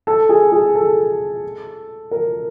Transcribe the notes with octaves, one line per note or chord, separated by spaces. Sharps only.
A4
G#4
G#4
A4
A#4